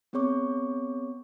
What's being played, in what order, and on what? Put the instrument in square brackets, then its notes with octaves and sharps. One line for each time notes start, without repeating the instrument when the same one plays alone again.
[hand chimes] B3 C4 G#4 C#5 C#6 D6